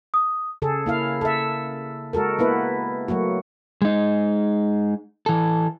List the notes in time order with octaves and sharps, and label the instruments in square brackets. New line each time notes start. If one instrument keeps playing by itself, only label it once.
[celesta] D#6
[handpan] C#3 G#4 A4
A#3 E4 F5
A4 E5
G#3 F#4 A4 A#4
A#3 B3 E4 B4
F#3 A3 A#3 F#4
[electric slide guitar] G#3 D#4
E3 A4